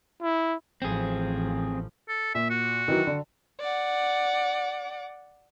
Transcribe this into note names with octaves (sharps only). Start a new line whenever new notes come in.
E4
A1 F3 C4 G#4
A4
A#2 E5
F#4
D#3 E3 F#3
D3
D5 F#5